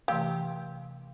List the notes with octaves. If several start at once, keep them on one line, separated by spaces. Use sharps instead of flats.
C3 E3 A3 G4 F5